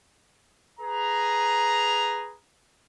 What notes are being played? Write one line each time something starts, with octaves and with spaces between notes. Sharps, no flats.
G#4 B4 A#5